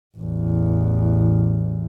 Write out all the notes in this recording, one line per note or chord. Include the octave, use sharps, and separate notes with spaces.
A1 E2